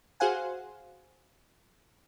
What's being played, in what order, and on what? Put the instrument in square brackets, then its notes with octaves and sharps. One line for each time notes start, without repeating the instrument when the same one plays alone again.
[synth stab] F#4 G#4 C5 F5 F#5 G#5